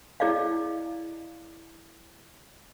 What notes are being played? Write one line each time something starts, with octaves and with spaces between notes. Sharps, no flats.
E4 G#4 D5 D#5 F5